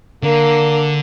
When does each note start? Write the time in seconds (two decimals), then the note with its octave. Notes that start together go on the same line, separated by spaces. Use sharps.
0.23 D3 A#3